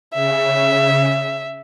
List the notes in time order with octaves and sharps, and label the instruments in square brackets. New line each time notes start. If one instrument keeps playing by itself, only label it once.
[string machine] C#3 [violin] E5